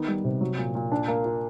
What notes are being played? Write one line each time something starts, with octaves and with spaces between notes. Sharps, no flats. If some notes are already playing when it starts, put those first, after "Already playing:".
Already playing: D#3 B3
G3
C3
F#3
A#2
A#2
D4
A#3
F4